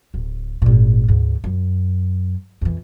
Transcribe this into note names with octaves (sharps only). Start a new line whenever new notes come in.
D1
G#1 A#2
D2 G#2
F#2
F2 E3